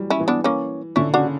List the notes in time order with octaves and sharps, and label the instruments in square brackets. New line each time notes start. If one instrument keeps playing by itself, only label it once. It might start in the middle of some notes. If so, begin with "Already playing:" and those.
Already playing: [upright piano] E3 F#3 G3
[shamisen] C#4 E4
[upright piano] E3
[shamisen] B3 D4
A#3 C#4
[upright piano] D3 [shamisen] C#4 E4
[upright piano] C#3 [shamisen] D4 F#4